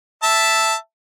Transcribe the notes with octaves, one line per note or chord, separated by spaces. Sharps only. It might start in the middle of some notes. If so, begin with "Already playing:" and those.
E5 A5